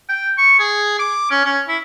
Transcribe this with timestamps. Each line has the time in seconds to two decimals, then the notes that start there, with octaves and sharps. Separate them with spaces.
0.09 G5
0.38 C#6
0.59 G#4
0.99 D6
1.31 C#4
1.45 C#4
1.68 E4